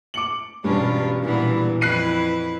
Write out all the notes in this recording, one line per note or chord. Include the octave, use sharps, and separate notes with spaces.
D6 C#7 F#7
E1 G2 C#4 D4 F4
A#2 E3 B3
F2 E4 B4 F#6 C7 D#7